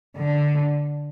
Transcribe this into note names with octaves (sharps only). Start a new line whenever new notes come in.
D3